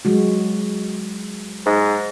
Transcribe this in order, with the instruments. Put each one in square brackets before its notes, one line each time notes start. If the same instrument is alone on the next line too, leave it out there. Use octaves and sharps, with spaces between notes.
[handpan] F#3 G#3 F#4
[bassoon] G#2